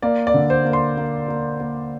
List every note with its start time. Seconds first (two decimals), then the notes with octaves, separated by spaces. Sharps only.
0.02 A#3 D5
0.27 D5
0.34 D3
0.50 C5
0.65 A#3
0.73 C6
0.97 A#3
1.28 A#3
1.60 A#3